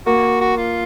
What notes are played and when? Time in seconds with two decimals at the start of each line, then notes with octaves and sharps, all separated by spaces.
0.06 A#3 F#4
0.41 F#4
0.57 F4